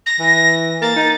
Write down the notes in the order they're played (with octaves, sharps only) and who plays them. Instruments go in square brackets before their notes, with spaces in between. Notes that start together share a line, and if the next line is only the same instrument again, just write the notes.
[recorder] A#6
[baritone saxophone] E3
[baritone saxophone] A#3 [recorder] A6
[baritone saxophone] D#4